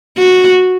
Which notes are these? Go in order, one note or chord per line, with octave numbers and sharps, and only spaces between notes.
F#4